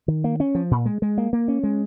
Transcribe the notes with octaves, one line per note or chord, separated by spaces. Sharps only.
D#3
A#3
C#4
F3
A#2
G#3
G#3
A#3
A#3
C#4
G#3